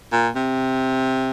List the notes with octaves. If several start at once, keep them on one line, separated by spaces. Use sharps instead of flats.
A#2
C3